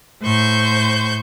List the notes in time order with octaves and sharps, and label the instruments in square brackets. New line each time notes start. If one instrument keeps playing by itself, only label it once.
[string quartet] A2 C5 C#6 G6